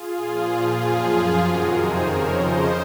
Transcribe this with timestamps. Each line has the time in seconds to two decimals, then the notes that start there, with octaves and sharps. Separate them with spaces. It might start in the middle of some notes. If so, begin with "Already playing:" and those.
Already playing: F4 G#4
0.16 A#2 F3
0.78 F#2 F3 F4 G#4
1.40 F2 C3 D#3 F#4 A#4
1.71 G#4 C5
2.02 F2 C#3 F3 A#4 C#5
2.33 C5 D#5